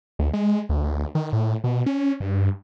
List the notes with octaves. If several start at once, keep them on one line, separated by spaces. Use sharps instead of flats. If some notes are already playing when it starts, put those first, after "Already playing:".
D2
G#3
D2
D2
D#3
A2
B2
C#4
G2